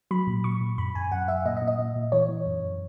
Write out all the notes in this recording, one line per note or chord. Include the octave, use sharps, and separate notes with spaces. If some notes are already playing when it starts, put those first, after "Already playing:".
F#3 B5
A#2
A#2 C#6
A#2
F#2 B5
F#2 G#5
F#2 F#5
F#2 E5
A#2 D#5
D#5
A#2
D#5
A#2
A#2
E3 C#5
E3
F#2
F#2